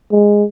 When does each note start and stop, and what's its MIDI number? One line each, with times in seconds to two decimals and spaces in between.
0.11 0.44 56